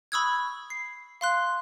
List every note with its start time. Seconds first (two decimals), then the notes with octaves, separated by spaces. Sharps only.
0.12 B5 C#6 D#6 E6 F#6 G#6
0.70 C7
1.21 F5 C6 F#6